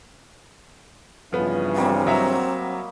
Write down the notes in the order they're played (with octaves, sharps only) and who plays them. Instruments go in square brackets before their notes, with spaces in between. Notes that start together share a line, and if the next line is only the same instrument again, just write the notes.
[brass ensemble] G2 C#3 E3 [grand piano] F3 B3
[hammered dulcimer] F#3 G3 A#3 [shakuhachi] C4
[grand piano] F#3 E5 A#5 [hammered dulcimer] D#5